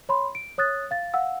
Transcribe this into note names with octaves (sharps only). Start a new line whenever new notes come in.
C#5 B5 C6
D7
C#5 D#6 F#6 A6
F5 A6
F5 F#5 E6